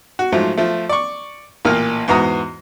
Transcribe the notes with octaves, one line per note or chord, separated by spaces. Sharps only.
F#4
G#2 F3 F#3 A3
F3 A3
D5 C#6
A1 A#2 A#3 F6
E2 G#2 B3 F#4 A#5 D#6